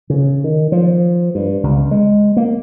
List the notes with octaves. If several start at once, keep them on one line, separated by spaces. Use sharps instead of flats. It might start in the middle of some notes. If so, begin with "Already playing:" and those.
C#3
D#3
F3
G2
C#2
G#3
A#3